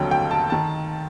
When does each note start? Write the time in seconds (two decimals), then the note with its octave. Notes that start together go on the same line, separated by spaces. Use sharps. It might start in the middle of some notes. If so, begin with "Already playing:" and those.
Already playing: F1 D#2 D3 F#3 G5
0.11 G5
0.31 A5
0.50 D#3 A5